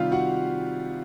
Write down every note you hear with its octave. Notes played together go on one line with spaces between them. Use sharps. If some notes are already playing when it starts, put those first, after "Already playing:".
Already playing: C3 D#3 G3 F4 F5
F#4 F#5